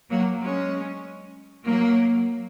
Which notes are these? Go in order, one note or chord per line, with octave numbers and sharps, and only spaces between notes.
F#3 A#3
G#3 C#4
F#3 A#3